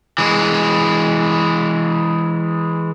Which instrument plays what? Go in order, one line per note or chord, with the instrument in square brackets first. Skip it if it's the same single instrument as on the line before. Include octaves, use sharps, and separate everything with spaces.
[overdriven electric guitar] E3 G#3